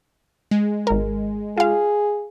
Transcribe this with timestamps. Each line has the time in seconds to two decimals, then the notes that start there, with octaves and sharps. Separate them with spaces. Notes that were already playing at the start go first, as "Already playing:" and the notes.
0.51 G#3
0.87 G#1 A#4
1.58 F4 G#4 F5